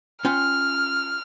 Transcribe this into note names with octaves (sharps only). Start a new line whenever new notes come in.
C#4 F4 G5 F6